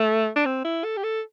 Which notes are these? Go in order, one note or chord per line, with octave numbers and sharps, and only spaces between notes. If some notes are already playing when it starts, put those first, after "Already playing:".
Already playing: A3
D4
C4
E4
A4
G4
A4